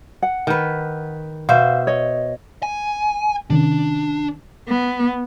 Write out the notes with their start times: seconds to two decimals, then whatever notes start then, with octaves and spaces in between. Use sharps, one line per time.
0.22 F#5
0.47 D#3 B4
1.49 B2 C5 E5 F5
1.87 C#5 D#5
2.63 G#5
3.50 C3 D#3 C#4 D4
4.67 B3